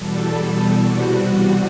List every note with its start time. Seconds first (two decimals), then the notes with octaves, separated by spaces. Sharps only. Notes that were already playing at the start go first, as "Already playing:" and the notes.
Already playing: E2 B2 G3 A4
0.75 E2 C3 G3 F#4